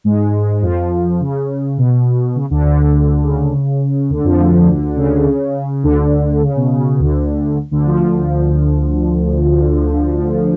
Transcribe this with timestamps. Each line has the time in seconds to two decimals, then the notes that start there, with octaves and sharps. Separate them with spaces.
0.04 G#2 G#3
0.62 F2 F3
1.20 C#3
1.78 B2
2.36 C#3
2.50 D2 D3
2.65 D2 D3
3.24 C#3
4.10 D2 D3
4.24 F2 F3
4.39 D2 D3
4.96 C#3
5.83 D2 D3
6.42 C#3
6.56 B2
6.71 C#3
6.99 D2 D3
7.71 D2 D3
7.86 F3